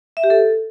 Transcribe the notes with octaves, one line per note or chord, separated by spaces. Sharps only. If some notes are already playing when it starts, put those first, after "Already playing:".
E5
G4
A4